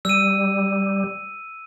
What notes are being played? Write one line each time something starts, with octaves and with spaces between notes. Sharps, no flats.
G3 E6 D#7